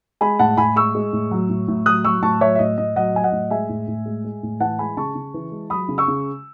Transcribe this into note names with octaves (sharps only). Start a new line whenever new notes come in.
G#3 G#5 B5
A2 F#5 A5
A2 G#5 B5
G#3 C#6 E6
G#3
A2
F#3
A2
A2
F#3 D#6 F#6
F#3 C#6 E6
A2 A5 C#6
F#3 C#5 E5
E5
A2 D#5
A2 D#5
F#3 D#5 F#5
F#3 G#5
D#5 F#5
A2
G#3 E5 G#5
A2
A2
G#3
G#3
A2
E3 F#5 A5
G#3 G#5 B5
C#3 A5 C#6
C#3
E3
G#3
F#3 B5 D#6
C#3
C#6 E6
C#3